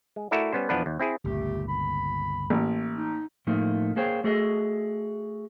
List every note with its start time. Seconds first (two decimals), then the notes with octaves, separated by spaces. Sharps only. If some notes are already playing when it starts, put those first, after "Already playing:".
0.16 G#3
0.31 A3 E4 F#4 A4 A#4 D5
0.52 G3 B3 C#4 C5
0.69 A#1 E2 F3 B3 D4 B4
0.86 D#2
0.99 C4 E4 G#4
1.25 G1 C#2 A#2 A3 G4
1.69 B5
2.50 A1 A#3
2.96 D#4
3.47 A2 F3 A3 A#3 D#4
3.96 A#3 G#4 C5 C#5 G5
4.24 A3 F#4 G#4 A4 D#5